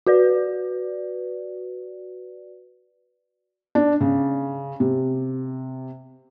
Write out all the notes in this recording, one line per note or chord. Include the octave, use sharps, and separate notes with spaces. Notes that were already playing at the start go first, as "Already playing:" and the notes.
F#4 B4 D5
D4
C#3
C3